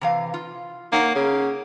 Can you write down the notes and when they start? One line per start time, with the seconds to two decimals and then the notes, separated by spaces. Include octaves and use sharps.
0.01 C3 E3 F5
0.34 F4
0.92 A#3 D#4 C#5 F#5
1.15 C#3